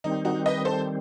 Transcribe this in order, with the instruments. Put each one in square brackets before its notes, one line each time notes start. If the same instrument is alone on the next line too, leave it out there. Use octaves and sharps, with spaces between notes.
[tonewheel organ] D#3 G3 C4 [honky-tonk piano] D#4
[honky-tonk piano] D#4 F#4
B4 D#5
A4 C5